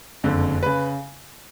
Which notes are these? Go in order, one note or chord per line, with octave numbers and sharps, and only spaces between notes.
F#1 F2 D3
C#3 B4